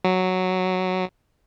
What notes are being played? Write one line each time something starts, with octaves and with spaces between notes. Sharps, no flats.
F#3